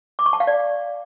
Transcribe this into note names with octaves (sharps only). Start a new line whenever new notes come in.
D6
C#6
A5
F5
D5